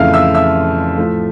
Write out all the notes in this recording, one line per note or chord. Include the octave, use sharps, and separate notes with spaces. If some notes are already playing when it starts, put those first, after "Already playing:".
Already playing: F2 C#3 E3 A3 E5 F5 F6
E5 E6
E5 E6
A2 F3 A3